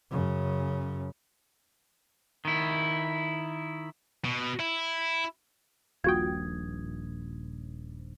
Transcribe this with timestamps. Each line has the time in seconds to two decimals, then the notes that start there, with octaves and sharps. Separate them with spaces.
0.10 F#2 C#3
2.45 D#3 E4
4.25 B2
4.60 E4
6.04 D#1 A#1 F4 F#4 G5 D#6 G#6